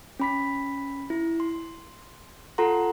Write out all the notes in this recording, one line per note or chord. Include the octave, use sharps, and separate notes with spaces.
C#4 B5 B6
E4
C6
F4 A4 F#5 A#5 C6